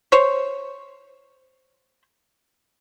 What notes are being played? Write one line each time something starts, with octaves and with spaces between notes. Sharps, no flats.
C5 C#5